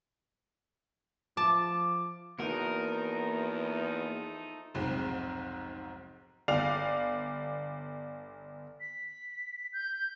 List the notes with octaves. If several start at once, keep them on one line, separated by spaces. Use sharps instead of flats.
F3 A5 D6
E2 F3 A3 A#3 D#4 F#4 A#4 F#5
F1 B1 G#2 C4
G1 D5 F5 F7
B6
G6